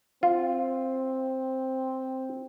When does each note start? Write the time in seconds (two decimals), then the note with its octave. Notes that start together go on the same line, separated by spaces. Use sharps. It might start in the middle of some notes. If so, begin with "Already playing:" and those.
0.23 C4 F4